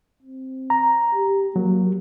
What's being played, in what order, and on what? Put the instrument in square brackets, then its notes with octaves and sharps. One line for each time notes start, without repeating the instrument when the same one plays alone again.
[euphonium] C4
[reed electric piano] A#5
[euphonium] G4
[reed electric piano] F#3 [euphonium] A#3